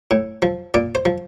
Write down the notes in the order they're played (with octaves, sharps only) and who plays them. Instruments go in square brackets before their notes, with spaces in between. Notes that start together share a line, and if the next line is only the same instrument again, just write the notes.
[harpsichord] A2
F3
A#2 D5
C5
F3